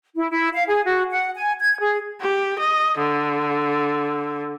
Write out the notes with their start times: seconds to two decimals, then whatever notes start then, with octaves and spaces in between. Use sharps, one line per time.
0.15 E4
0.31 E4
0.54 F5
0.68 G#4
0.86 F#4
1.12 F#5
1.35 G#5
1.60 G#6
1.80 G#4
2.21 G4
2.59 D#5
2.98 D3